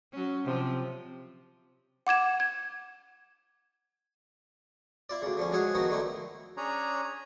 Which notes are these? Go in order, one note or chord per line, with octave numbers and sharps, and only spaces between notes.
F#3 C#4
C3 F3
F#5 D6 G#6 E7
G#6
E4 F4 D5
D2 C#3
D3 F3 C#4
F#3 G#3 G#4 C#5 F5 F#5
D#3 F3 F#3 B3 D#4 F#4
D3 D#3 A3 E4
C#4 D4 G#4 C#5 A#5